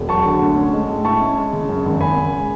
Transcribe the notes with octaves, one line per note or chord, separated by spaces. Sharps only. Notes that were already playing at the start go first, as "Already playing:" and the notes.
Already playing: E1
F#3 A5 C#6
D3
D2
C#4
G#3
A2
E4 A5 C#6
C#4
G#3
C#3
F#2
G#1
G#1 G#5 B5
C#3